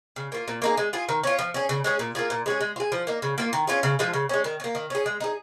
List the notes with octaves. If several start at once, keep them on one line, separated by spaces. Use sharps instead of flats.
C#3
A#3 F4
A#2
A#3 D#4 G#4
G#3
F4 G#4
D#3
C#4 F4
F3
C#4 G#4
C#3
G#3 C#4 G#4
A#2
A#3 F4 G#4
A#2
G#3 C#4 G#4
G#3
F4
G#4
F3
A#3 D#4
C#3
A#3 F4
D#3
C#4 F4 G#4
C#3
F3 G#3 F4
C#3
G#3 C#4
D#3
C#4
A#3
D#3
C#4 G#4
G#3
D#4 G#4